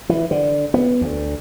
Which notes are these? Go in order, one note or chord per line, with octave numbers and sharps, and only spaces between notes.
E3
D3
B3
D2